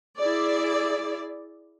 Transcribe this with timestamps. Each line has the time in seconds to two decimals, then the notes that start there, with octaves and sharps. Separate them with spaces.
0.18 E4 G#4 D5